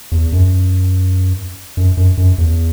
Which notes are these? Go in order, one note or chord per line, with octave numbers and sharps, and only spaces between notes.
E2
F#2
F#2
F#2
F#2
E2